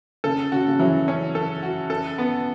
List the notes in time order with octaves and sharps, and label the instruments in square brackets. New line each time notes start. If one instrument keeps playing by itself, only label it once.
[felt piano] C#3 [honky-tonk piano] A4
[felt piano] C#3 [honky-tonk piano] F#4
[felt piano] C#3
[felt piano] E3 [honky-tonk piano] F#3
[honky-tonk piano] C#4
A4
F#4
A4
B3